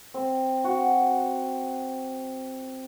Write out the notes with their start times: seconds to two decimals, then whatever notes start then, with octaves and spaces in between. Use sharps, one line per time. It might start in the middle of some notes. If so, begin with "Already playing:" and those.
0.14 C4
0.64 F#4